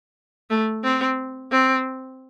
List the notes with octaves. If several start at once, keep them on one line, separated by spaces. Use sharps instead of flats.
A3
C4
C4